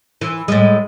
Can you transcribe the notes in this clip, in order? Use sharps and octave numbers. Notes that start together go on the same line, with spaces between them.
E3
A2 G#3